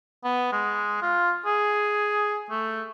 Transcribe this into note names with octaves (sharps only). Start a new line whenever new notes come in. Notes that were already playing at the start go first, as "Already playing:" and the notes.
B3
G#3
F4
G#4
A3